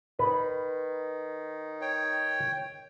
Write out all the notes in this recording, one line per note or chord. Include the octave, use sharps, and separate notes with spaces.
D#3 B4
C#5 G5